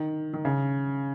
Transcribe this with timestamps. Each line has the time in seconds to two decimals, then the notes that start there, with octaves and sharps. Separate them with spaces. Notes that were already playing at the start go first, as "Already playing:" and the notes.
Already playing: D#3
0.33 D#3
0.45 C#3